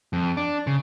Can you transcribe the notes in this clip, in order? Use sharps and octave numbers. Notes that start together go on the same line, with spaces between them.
F2
D4
C#3